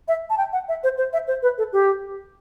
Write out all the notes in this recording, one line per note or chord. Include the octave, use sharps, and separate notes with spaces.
E5
A5
G5
F#5
E5
C5
C5
E5
C5
B4
A4
G4